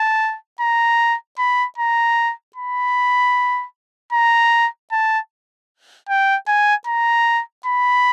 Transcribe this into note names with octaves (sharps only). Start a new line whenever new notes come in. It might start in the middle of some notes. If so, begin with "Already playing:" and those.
Already playing: A5
A#5
B5
A#5
B5
A#5
A5
G5
G#5
A#5
B5